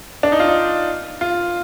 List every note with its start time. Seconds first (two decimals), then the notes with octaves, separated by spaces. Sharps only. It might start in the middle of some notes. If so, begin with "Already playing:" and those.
0.23 D4
0.32 D#4
0.40 F4
0.47 D#4
1.21 F4